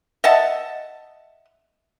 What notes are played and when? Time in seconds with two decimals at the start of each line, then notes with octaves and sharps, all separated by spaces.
0.24 D#5 E5 F#5 A5